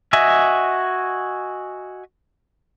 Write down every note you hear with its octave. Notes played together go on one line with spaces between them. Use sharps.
F#4 D#5 E5 G#5